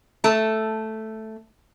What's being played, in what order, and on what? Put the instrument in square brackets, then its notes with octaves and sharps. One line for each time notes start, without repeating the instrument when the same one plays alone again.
[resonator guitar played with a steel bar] A3 A5